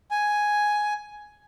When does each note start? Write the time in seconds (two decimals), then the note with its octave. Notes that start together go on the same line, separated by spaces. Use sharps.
0.11 G#5